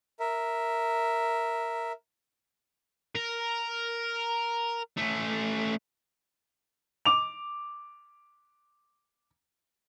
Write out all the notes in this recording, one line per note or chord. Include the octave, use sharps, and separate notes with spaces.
A#4 E5
A#4
A3 C#4
D6 F7